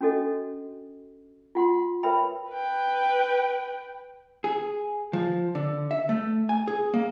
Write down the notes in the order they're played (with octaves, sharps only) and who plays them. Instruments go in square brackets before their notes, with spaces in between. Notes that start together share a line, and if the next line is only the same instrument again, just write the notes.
[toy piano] C#4 D4 F#4 A4 D#5
F4 F#5 C6
A#4 B4 C#5 E5 G5 B5
[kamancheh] B4 G5
[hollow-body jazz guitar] G#4
F3
D3
E5
A3
G#5
G#4
A#3